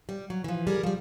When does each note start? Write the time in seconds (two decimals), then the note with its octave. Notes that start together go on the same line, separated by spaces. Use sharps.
0.09 G3
0.30 F#3
0.44 E3 F3
0.67 G3 G#4 A#4
0.83 F3 G3